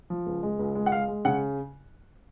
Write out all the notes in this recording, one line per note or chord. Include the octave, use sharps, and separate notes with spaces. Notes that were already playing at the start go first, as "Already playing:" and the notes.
F3
C#2
G#3
C#2
G#3
F#5
G#3 F5
G#3
C#3 F#5